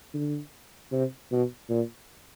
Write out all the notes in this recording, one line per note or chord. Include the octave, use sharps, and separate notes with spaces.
D3
C3
B2
A#2